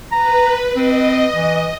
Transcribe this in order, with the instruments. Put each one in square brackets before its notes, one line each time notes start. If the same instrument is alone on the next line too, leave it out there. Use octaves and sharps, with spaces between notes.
[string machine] B4 [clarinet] A#5
[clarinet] C4 [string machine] D#5
[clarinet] E3